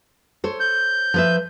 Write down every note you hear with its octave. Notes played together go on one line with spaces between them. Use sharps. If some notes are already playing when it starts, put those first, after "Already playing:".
A4 C5 C#5
G6
F3 B4 E5